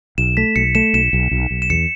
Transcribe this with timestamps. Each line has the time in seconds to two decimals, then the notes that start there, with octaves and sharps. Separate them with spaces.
0.18 B1 E7
0.37 A3 B6
0.56 B1 C#7
0.75 A3 E7
0.94 B1 E7
1.13 B1
1.31 B1
1.51 B1
1.62 E7
1.70 E2 C#7